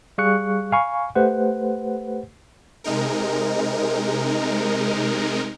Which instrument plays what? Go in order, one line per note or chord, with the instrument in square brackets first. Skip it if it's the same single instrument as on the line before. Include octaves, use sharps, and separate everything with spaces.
[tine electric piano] G3 G#4 F5 C#6 F#6 C#7
F5 G#5 B5 C#6
A3 G4 B4 C5 F#5
[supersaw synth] C3 G#3 D#4 A#4